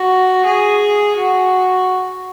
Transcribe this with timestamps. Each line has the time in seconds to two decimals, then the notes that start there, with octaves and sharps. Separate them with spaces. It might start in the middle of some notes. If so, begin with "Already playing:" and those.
Already playing: F#4
0.45 G#4
1.17 F#4